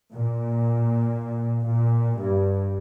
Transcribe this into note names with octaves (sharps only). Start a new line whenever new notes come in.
A#2
A#2
G2